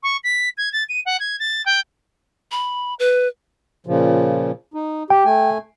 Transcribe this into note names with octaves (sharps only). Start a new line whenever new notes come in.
C#6
B6
G#6
A6
D#7
F#5
G#6
A6
G5
B5
B4
A#2 C#3 F3
D#4
G4 G5
A3 G#5